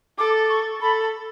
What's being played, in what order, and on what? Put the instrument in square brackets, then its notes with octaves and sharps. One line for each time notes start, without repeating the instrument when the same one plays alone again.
[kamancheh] A4 [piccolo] D6
[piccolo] C#6
[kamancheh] A4 [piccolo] B5